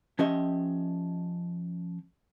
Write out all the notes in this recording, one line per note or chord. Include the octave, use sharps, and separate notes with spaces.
F3 C#4 G4 D#5 E5